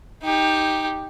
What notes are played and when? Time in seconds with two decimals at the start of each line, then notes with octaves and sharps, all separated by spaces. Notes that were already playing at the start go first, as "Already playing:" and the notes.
0.23 D#4 G4